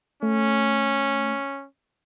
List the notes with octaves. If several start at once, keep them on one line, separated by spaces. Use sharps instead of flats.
A3 C#4